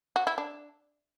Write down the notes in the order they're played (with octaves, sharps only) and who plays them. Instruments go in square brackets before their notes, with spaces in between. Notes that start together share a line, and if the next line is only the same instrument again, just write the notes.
[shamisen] F#4
E4
D4